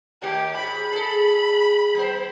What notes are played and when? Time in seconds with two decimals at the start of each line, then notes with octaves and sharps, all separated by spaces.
0.22 D#2 A3 G4
0.57 G#2 B5
0.92 G#4 A4
1.95 F#3 B3 C5